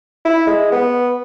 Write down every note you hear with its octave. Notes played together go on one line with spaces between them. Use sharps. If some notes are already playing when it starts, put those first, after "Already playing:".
E4
G#3
B3